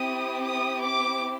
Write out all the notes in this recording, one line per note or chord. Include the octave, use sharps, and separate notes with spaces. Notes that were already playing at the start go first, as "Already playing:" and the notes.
Already playing: C4 E4 G4 D#6
D#6
D6